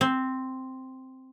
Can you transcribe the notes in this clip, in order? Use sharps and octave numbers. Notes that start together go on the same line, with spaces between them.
C4